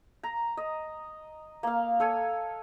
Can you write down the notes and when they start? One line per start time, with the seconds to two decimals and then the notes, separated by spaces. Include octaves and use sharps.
0.23 A#5
0.57 D#5
1.63 A#3 F5
2.00 A4 C#5 G#5